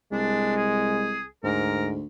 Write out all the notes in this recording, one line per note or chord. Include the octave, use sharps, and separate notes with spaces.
C2 G#3 D4
G#4
D2 G#2 A#4